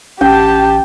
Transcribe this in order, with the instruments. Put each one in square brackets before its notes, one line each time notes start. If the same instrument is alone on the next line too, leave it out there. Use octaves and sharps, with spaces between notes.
[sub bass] A1 [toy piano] C#4 [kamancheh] G4 A5 [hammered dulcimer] G5